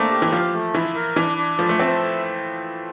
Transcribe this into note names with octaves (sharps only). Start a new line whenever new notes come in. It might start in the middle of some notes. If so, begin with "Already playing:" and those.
Already playing: A3 A#3 C4 D4
G4
E3
F3 F5
A3
E3 E4
A#4
E3 D4
D4
F3 A4
A3
C4 E5